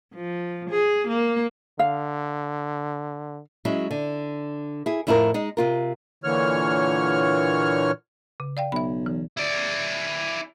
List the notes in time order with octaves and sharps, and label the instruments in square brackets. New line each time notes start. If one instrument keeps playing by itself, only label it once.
[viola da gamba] F3
G#4
A#3
[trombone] D3 [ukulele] F5
[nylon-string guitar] F#3 G#3 C#4 E4
D3
E4 G#4
F2 A2 E4 F4 G#4 A#4
G#3 D#4
C3 F4 A#4
[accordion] A#2 D3 E3 C#5 F6
[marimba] C#3
D5 F5 G5
[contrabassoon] B1 [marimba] E5 B5
[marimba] E3
[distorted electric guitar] E4 D5